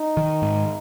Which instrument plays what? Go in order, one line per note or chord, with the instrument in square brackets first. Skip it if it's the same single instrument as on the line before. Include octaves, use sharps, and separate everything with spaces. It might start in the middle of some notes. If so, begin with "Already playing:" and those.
Already playing: [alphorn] D#4
[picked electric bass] D#3
G#2